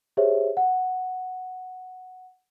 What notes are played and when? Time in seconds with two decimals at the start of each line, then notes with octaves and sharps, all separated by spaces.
0.17 G4 G#4 C5 C#5 E5
0.57 F#5